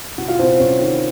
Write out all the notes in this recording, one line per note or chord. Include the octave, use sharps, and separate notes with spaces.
C2 F#4 F#5
F4 F5
C2 C4 C5
C5
C2 C#4 C#5
D#3